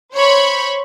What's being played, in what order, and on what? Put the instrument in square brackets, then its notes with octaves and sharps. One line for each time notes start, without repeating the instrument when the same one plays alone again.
[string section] C5 C#5 B5 C#6